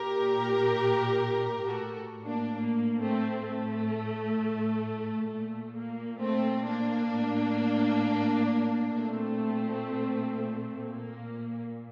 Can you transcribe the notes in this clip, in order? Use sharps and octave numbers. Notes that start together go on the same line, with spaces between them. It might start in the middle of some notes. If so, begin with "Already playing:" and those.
Already playing: A#2 G4 A#4
A2 F#4 A4
A#3 D4
A#3
A3 C4
A2 A3
A#2 A3
A#3
A3 C4
A#3 D4
A2
A#2 A3 C4
A#2 A#3